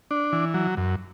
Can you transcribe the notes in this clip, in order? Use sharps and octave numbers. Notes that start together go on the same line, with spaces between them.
D4
E3
F#3
F#2